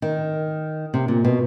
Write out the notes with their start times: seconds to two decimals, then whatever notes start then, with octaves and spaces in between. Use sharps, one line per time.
0.02 D#3
0.94 C3
1.08 A#2
1.25 B2